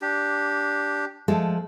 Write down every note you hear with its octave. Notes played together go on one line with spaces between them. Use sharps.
D4 G4
F3 G#3 A3